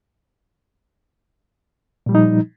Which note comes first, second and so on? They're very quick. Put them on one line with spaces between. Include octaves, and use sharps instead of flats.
A#2 G3 F3 D#4